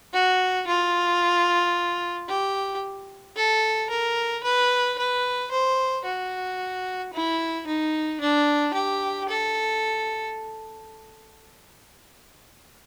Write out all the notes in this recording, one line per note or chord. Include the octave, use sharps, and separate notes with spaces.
F#4
F4
G4
A4
A#4
B4
B4
C5
F#4
E4
D#4
D4
G4
A4